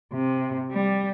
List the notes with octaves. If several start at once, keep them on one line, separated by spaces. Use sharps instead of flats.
C3
G3